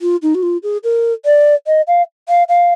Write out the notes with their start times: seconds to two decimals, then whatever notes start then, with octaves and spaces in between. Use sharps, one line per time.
0.01 F4
0.22 D#4
0.34 F#4
0.42 F4
0.63 G#4
0.83 A#4
1.25 D5
1.67 D#5
1.87 F5
2.28 F5
2.49 F5